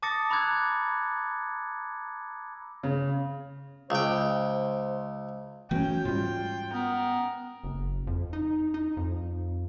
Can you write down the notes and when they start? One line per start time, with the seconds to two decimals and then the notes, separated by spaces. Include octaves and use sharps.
0.02 A5 D6 D#6 A6 A#6 C#7
0.30 A#5 B5 D6 E6 F#6 G#6
2.83 C#3
3.90 C#2 C5 G5
5.71 E3 A3 B3 C#4 F#4 G5
6.05 G#2 G3 F4
6.73 B3 A#4
7.64 F#1
8.07 F2
8.33 D#4
8.74 D#4
8.97 F2